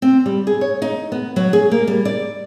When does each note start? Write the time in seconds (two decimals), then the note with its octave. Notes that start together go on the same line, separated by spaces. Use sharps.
0.02 C4
0.26 G3
0.47 G#4
0.61 C#5
0.82 D#4
1.12 B3
1.36 F#3
1.53 G#4
1.71 A#3
1.87 G3
2.05 D5